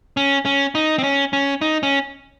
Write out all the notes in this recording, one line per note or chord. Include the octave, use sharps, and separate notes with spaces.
C#4
C#4
D#4
C4
C#4
C#4
D#4
C#4